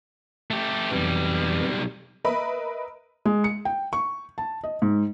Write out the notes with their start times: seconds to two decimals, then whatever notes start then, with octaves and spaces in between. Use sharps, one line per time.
0.51 A3 G4
0.92 B1 F2 E3 G3
2.25 A#4 B4 D#5 E5 B5
3.25 G#3
3.44 C#7
3.65 G5
3.93 C#6
4.38 A5
4.64 D#5
4.82 G#2